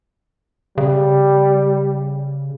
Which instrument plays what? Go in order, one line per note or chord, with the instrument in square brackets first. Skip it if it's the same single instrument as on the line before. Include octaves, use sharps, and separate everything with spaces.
[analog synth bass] C#3 [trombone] G3